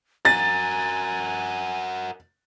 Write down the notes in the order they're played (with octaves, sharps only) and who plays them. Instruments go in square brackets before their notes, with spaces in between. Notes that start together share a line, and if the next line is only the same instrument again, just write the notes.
[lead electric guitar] F#4 A#4 [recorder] G#5 [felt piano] A6